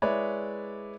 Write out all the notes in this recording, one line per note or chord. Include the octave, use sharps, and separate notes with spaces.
G#3 E4 B4 C#5 D5 E5